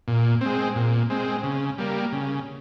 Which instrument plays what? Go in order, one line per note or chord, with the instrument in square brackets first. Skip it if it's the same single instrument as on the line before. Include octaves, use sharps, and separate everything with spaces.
[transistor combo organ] A#2
G#3 C4
A#2
G#3 C4
C#3
G3 A#3
C#3